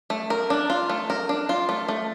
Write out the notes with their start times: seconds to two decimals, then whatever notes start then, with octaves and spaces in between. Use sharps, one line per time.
0.10 A3
0.30 A#4
0.50 D4
0.70 F4
0.90 A3
1.10 A#4
1.29 D4
1.49 F4
1.69 A3
1.88 A3